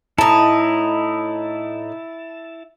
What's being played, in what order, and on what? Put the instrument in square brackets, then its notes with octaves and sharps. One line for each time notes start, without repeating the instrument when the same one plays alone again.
[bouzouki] A2 D#4 [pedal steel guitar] E4 A5